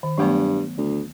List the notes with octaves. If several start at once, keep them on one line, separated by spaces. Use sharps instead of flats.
D#3
G2 F#3 A3 B3
D2